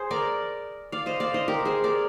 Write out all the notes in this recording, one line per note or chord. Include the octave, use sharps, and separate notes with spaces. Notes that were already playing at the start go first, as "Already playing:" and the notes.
Already playing: G#4 C5
A#4 D5
D5 F5
C5 D#5
D5 F5
C5 D#5
G4 A#4
G#4 C5
A#4 D5